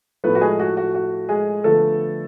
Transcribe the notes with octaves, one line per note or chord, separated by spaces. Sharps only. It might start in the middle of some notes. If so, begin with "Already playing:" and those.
A2 F3 A3 B3 B4
F#4
G#3 G#4
F#4
F#4
F#4
G#3 G#4
D3 F3 A3 B3 A4